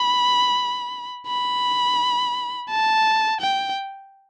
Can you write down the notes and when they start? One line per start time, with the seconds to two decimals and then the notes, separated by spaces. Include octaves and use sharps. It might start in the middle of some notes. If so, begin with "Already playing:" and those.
Already playing: B5
1.28 B5
2.70 A5
3.40 G5